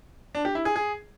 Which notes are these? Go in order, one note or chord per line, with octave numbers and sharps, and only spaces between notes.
D4
G4
E4
G#4
G#4